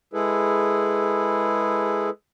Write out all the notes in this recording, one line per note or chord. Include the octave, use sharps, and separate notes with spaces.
G#3 E4 G#4 A4 B4